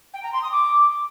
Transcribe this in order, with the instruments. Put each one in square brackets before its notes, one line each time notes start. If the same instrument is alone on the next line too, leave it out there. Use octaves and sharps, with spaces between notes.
[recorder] G5
A#5
C6
D#6
D6